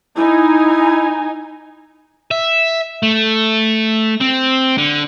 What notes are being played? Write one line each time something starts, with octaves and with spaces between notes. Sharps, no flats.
D#4 E4 G#5
E5
A3
C4
D3